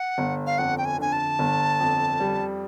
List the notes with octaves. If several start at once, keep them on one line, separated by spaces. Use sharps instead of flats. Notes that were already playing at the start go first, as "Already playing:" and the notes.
Already playing: F#5
G1
F5
F2 F#5
G5
G#5
D3 G#5
A5
G1
F2
G3